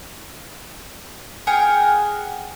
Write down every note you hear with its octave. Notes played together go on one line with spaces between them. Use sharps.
G#4 A#4 F#5 G5